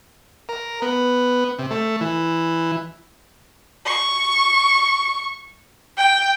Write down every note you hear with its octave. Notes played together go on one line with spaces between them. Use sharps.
A#4
B3
C3
A3
E3
C#6
G5